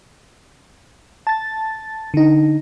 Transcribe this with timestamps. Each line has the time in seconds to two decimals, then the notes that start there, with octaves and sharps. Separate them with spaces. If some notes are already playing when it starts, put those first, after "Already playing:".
1.27 A5 A6
2.14 D3 D#4